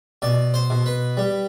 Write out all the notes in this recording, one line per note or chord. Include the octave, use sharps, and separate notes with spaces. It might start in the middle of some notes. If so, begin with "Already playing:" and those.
B2 D5
C5
B2
B4
G3